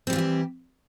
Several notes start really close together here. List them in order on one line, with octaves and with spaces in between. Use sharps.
C4 G3 E3 F4 G4